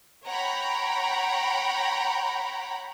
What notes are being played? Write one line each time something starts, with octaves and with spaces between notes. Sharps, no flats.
C#5 F#5 G5 A#5 B5